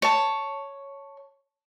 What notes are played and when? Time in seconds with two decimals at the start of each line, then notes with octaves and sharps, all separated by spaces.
0.02 C#5 A5